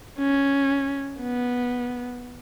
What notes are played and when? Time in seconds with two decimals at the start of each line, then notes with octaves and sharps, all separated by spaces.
0.19 C#4
1.21 B3